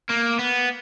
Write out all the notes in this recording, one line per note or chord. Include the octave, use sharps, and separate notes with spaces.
A#3
B3